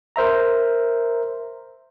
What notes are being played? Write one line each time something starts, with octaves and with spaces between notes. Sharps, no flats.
A#4 C5 E5 A#5